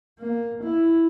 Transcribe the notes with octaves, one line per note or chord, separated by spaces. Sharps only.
A#3
E4